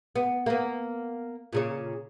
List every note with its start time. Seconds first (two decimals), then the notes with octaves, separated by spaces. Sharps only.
0.16 B3
0.46 A#3 B3
1.53 A#2 C#3 C#5